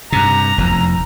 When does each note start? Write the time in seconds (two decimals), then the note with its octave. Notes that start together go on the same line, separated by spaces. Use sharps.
0.12 G2 C3 A#5
0.58 F1 E2